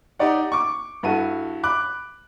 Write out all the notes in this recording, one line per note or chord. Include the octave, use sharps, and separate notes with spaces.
D#4 G4 D5 F#5
C#6 D6
G2 E4 F#4 A4 D#7
B5 D6 F#6